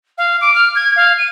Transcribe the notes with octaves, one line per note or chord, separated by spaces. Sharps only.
F5
D6
F6
G#6
F5
D#7